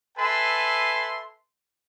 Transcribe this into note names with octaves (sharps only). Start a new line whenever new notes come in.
A4 B4 E5 G#5 A5 C6